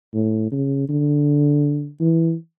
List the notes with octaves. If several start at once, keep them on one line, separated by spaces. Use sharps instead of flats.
A2
C#3
D3
E3